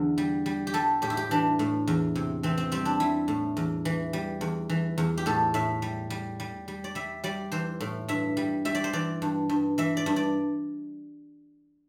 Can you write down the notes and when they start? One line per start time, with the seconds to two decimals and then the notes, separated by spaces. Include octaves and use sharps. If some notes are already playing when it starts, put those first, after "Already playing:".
Already playing: E2 D3
0.18 G3
0.46 G3
0.67 G4
0.74 G3 A4
1.02 A2 G4
1.10 E4
1.17 G4
1.31 E3 D4
1.59 A2
1.87 E2
2.15 C3
2.43 E3 C4
2.58 C4
2.72 G3 C4
2.85 D4
3.00 G3 E4
3.28 A2
3.57 E2
3.85 E3
4.13 G3
4.41 E2
4.69 E3
4.98 E2
5.18 G4
5.26 A2 A4
5.54 A2 E5
5.82 G3
6.10 G3
6.40 G3
6.68 G3
6.84 D5
6.95 G3 E5
7.24 G3 D5
7.52 E3 C5
7.80 A2
8.08 G2 E5
8.37 G3
8.65 G3 E5
8.75 D5
8.84 C5
8.93 E3 D5
9.22 G2
9.49 G2
9.78 E3 E5
9.97 D5
10.06 G2
10.16 D5